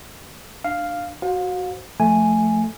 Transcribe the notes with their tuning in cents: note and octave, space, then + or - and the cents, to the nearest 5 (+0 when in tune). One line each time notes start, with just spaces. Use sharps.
D4 +25 F5 +0
F#4 +0 C5 +0 F5 +40
F3 +5 A3 +0 G#5 +0